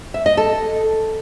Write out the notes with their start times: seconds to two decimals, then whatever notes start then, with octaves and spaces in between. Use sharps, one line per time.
0.14 E5
0.26 D#5
0.37 A4